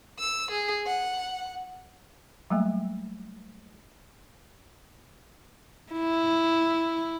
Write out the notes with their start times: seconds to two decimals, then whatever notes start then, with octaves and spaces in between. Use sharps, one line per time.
0.19 E6
0.51 G#4
0.86 F#5
2.50 F#3 G3 A3 A#3 E5
5.93 E4